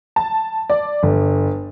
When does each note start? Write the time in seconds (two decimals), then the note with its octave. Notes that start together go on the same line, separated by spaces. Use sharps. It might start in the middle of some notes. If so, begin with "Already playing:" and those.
0.16 A5
0.70 D5
1.03 G1